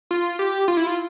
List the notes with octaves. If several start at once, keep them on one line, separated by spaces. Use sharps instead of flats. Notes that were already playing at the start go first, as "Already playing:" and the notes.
F4
G4
F4
E4
F4